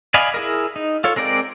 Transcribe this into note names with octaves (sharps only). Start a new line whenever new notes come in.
D5 D#5 F5 G#5 B5
E4 G#4 A#4
D#4
F4 A4 C#5
G#3 C4 A#4 D5 G5